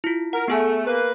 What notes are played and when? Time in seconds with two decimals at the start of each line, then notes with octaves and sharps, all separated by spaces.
0.04 E4 F4
0.33 A#4 F#5
0.48 A3 B3 G#4 G#5
0.87 A#3 B4